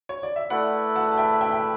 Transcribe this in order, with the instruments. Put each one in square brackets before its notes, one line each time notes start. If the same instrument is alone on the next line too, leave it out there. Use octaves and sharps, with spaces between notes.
[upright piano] C#5
D5
E5
[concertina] A3 E4 B4 [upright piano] D5 F#5
[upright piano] F#5 A5
A5
E5 G5
E5 G5
G5